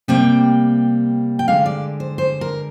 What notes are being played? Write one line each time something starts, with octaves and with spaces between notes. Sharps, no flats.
C3 G3 A#3 G5
G5
D3 G#3 F5
D5
C5
C5
A#4